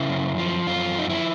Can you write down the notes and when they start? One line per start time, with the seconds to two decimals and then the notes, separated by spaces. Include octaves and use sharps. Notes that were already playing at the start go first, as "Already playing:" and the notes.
Already playing: C#3 E4
0.09 F#2
0.38 F3
0.67 F#2 F4
0.95 F3 D#4
1.09 E4